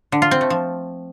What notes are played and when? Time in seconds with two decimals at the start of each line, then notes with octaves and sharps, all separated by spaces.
0.12 D3
0.22 F4
0.31 C4
0.41 A3
0.50 F3